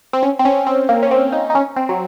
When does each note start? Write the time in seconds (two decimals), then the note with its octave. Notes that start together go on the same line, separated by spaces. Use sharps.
0.13 C4
0.23 C#4
0.39 C4
0.45 C#4
0.67 C4
0.89 A#3
1.03 C#4
1.11 C4
1.32 D#4
1.50 D#4
1.55 C#4
1.77 C4
1.89 F#3